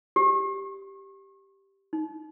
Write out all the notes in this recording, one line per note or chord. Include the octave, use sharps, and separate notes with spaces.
G4
D#4